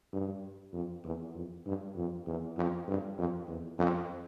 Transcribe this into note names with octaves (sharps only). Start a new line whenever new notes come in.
G2
F2
E2
F2
G2
F2
E2
F2
G2
F2
E2
F2